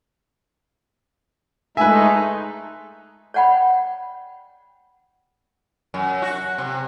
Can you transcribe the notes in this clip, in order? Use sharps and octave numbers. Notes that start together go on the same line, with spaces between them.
G#3 A3 D#4 B4 E5 G#5
C#5 D5 F#5 G5 B5
F#2
F#4
C3